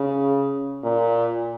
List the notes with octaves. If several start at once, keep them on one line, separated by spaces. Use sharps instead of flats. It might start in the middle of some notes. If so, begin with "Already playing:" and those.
Already playing: C#3
A#2